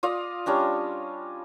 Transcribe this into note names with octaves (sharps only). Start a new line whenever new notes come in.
F4 D5 D#5 F5
G3 C#4 D4 D#5